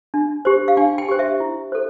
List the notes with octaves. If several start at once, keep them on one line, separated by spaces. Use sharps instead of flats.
D4
G4 C5
F5
D4 G5
G5
G4 C5
E5
E4
A4 C5